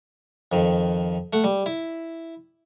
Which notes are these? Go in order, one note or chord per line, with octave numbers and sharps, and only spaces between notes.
F2 D#3
A3 F#5
G3
E4